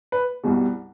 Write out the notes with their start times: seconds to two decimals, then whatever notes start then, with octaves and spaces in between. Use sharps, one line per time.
0.12 B4
0.43 C2 B2 G3